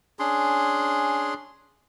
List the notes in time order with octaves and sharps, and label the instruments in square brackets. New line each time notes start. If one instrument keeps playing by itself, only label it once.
[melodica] C#4 D4 G#4 C6